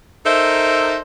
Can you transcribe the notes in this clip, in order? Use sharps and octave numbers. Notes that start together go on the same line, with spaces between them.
D#4 A4 A#4 C5 D#5 E5